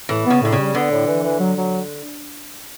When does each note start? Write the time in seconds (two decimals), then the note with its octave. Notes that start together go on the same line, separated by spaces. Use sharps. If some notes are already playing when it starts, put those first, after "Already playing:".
0.09 A2 E3
0.25 B3
0.30 C#3
0.42 A2 D3
0.52 C#3
0.58 G3
0.74 D3 B3
0.91 A2
1.07 E3
1.23 E3
1.39 F#3
1.56 F#3